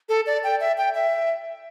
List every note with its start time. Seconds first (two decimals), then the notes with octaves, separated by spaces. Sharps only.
0.09 A4
0.27 D5
0.44 G5
0.60 E5
0.78 G5
0.94 E5